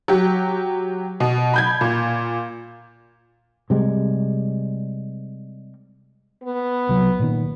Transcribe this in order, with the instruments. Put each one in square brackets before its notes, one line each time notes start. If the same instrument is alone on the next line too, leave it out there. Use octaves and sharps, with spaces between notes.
[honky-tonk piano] F#3 G4
B2
B5 G6 G#6
A#2
[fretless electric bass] C3 G3 G#3
[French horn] B3
[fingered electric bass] C2 F#3
A#2 D#3